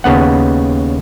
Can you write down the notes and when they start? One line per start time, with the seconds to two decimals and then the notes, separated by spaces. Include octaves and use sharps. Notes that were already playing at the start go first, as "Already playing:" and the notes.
0.04 D#2 C#3 B3 F#5